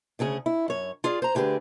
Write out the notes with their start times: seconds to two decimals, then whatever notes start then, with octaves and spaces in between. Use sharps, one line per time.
0.19 D2 C#3 C#4 G#4
0.46 E4
0.68 F#2 C#5
1.04 F4 G#4 D5
1.22 C5 A#5
1.35 D2 D3 G4 G#4 B4